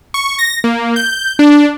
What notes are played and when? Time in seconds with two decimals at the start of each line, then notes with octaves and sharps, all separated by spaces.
0.14 C#6
0.39 A#6
0.64 A#3
0.96 G6
1.39 D4